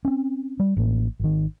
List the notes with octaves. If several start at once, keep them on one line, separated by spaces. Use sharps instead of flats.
C4 C#4
G3
A1 A2 A#3
G#1 D#3